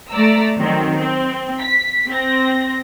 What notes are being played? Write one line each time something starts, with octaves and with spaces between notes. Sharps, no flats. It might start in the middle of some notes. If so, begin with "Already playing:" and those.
A3 D5 A#5 E6
D#3 F#3 C4
C4
B6
C4 A#6